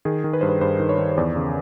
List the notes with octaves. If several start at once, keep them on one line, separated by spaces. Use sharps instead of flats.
D#3 G#4
D#3
B4
G2 C5
B4
G2 C5
D#3
C#5
D#3
C#5
E2 D5
C#3